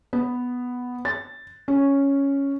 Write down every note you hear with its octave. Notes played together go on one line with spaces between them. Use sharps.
B3
A6
C#4